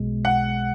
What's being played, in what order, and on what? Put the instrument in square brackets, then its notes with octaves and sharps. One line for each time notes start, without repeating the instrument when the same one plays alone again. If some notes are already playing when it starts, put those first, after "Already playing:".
Already playing: [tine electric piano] B1 B2 G#3
[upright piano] F#5